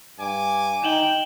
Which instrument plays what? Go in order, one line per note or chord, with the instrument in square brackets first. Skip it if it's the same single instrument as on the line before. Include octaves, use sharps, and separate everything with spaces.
[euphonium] G2 [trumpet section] G#5 D6
[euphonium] D#4 [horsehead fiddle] G5 [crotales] E7 F#7 G7